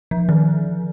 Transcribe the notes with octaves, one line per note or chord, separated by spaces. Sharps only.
F3
D#3